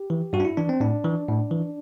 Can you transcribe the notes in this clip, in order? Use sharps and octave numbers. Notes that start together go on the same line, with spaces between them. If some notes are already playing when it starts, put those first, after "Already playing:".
Already playing: G4
E3
G2 F#4
D4
E4
E3 D4
C4
A2 D4
E3
A2
E3